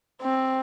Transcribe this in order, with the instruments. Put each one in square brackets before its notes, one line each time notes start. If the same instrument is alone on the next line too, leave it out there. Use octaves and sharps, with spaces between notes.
[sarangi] C4